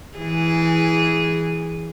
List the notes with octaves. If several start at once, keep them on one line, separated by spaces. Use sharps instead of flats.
E3 G#4